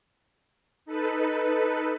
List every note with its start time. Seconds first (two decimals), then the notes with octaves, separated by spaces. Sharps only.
0.85 D#4 A4 B4